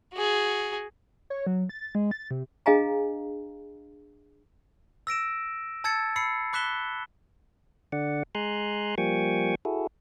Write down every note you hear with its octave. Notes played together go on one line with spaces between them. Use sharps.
F#4 G#4
C#5
F#3
A6
G#3
A6
C3
D4 G#4 D#5 F5 G#5 A#5
E6 A#6 D7 E7
A5 E6 G#6 A6 C#7
B5 E6 C7 C#7
B5 D6 F#6 B6 E7 G7
D3 D5 F#5
G#3 G#5 A#5 C6 F#6
F3 G3 A#3 G5 G#5 C#6
E4 F#4 G#4 A4